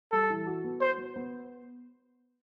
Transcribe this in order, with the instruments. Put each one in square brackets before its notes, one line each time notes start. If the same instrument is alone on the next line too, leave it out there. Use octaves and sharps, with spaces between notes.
[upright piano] G3 [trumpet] A4
[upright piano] E3
F#4
B3
[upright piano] F#4 [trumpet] C5
[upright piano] B3
B3